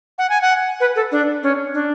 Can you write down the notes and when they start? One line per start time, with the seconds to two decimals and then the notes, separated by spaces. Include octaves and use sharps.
0.18 F#5
0.30 G#5
0.41 F#5
0.80 B4
0.96 A4
1.12 D4
1.43 C#4
1.74 D4